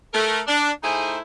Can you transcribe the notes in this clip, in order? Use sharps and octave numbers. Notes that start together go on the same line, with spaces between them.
A3 A#4
D4
A3 D#4 E4 G#4 C5 G#5